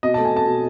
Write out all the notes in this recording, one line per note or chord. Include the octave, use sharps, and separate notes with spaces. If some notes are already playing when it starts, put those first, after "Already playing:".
B2 D#5
A3 A5
G#5
A3 A5
B2